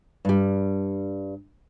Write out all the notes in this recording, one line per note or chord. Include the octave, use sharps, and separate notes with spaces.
G2 G3